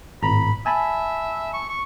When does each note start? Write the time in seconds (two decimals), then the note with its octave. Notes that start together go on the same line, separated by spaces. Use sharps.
0.23 G#1 A2 A#5 B5
0.66 E5 G#5 A5 B5
1.53 C#6
1.69 C#6